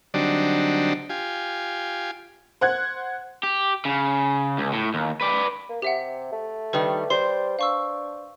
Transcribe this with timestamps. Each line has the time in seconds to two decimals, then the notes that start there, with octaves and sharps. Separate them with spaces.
0.14 D3 F#3 G3 C4 D4 D#4
1.10 F4 G4 G#5
2.61 C5 F#5 F#6 G#6
3.43 G4
3.85 C#3
4.58 C#2
4.73 A2
4.94 D#2
5.21 B4 D5
5.69 A#3
5.82 C3 G4 E5 F#5
6.32 A3
6.73 D#3 G3 B4
7.10 G3 C5 C6
7.59 D4 F5 C#6 E6